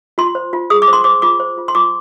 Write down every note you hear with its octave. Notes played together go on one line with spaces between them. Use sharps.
F4 C6
C5
F4
G#4 D#6
D6
C5 C6
C5 D6
F4 D6
C5
F4
C6
F4 D6